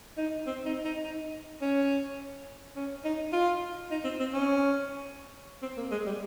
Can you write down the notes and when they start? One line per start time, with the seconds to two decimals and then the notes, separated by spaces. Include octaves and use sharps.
0.17 D#4
0.47 C4
0.66 D#4
0.85 D#4
1.03 D#4
1.62 C#4
2.76 C#4
3.05 D#4
3.33 F4
3.91 D#4
4.04 C4
4.20 C4
4.33 C#4
5.62 C4
5.77 A#3
5.91 G#3
6.06 G3